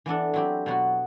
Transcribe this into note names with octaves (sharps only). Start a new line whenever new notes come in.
E3 B3 D4 A4
F#3 C4 E4 G4
B2 F#3 B3 F#4